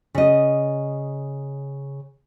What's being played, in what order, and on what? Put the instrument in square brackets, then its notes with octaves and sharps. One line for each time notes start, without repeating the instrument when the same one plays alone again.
[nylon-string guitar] C#3 D#5